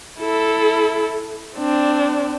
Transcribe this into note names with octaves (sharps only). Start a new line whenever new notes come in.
E4 A4
C4 D4